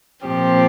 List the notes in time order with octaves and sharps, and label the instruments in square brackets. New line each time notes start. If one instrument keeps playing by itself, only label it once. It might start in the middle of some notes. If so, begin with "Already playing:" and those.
[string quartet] A#2 F3 C4 G4